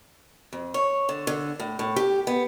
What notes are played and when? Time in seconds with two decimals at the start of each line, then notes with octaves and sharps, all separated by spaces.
0.53 F2
0.74 C#5
1.09 D3
1.27 D3
1.60 A2
1.79 A2
1.96 G4
2.27 B3